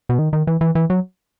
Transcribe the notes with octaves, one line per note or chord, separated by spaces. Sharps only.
B2
D#3
D#3
E3
E3
E3
F#3